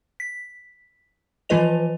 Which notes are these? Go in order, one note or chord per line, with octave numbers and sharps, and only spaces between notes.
B6
E3 F3 F4 B4 D#5 F7